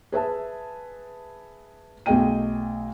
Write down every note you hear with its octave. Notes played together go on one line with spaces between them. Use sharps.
G#4 B4 E5 A5
B1 A3 G#4 D#5 G5 D#7